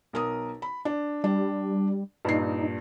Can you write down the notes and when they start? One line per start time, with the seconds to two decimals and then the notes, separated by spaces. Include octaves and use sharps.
0.13 B1 A#4 D#6
0.62 B5
0.85 D4
1.24 G3 D4
2.25 G2 A#2 D#4 C7